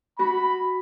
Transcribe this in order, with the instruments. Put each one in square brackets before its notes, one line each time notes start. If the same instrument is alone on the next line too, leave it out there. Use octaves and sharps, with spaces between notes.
[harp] F#4 [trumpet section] B5